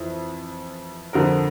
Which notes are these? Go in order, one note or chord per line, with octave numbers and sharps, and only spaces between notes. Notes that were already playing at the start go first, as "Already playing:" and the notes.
Already playing: F2 E3
F2 D3 F3 A#4